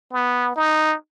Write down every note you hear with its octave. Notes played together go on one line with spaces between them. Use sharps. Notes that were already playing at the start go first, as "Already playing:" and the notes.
B3
D#4